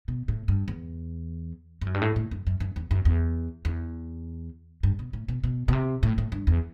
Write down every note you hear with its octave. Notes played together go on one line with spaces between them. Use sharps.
B2
A2
G2
E2
G2
F#2
G2
A2
A2
F#2
F#2
F#2
E2
F#2
E2
E2
G2
B2
A2
B2
B2
B2
C3
A2
A2
G2
E2